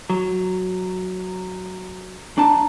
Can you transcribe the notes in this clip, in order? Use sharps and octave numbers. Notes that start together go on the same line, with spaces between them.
F#3
D4 D#4 A5